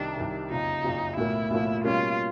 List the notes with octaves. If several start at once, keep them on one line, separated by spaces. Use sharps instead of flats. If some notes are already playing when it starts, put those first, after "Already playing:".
Already playing: C2 C3 D#3 D4
C2 C3 D#3
F#1 F2 C#3 D#4
F#1 F2 C#3
B1 A2 F3 A#3 E4
B1 A2 F3 A#3
B2 G3 A#3 C#4 F4